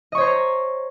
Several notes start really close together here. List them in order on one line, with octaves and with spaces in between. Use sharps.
D#5 C#6 C#5 C5 A#5